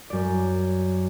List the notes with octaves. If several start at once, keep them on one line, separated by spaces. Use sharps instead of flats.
F#2 D5